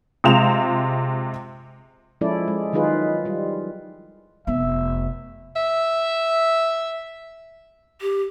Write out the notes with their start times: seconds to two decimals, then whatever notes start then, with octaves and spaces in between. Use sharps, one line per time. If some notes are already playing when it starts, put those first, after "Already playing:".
0.24 C3 G#3 F4 E7 F7
2.21 F3 G#3 C#4 E4 A4 D5
2.48 G#3
2.73 D#3 F#3 D#4 F4 G#4 B4
3.25 G3 F4
4.47 F1 B3 E5
5.56 E5
8.01 G4